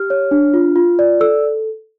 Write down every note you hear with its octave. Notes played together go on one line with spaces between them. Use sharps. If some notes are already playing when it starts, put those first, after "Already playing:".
Already playing: G4 F6
C#5
D4
F4
F4
D5
A4 E6